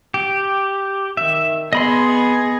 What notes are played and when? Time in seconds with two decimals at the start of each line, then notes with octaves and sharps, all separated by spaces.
0.14 G4
1.17 D#3 E5
1.73 B3 G#4 D#5 B5 C6